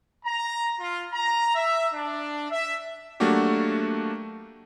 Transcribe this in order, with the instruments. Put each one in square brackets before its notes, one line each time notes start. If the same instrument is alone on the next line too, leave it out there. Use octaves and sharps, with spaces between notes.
[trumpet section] A#5
F4
A#5
E5
D4
E5
[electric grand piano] F#3 A3 A#3 D4 F#4 G4